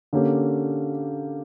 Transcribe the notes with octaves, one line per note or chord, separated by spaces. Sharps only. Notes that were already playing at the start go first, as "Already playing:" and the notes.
D3 A#3 C#4 G4